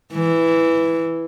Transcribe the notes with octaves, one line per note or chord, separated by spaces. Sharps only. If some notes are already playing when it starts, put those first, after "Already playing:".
E3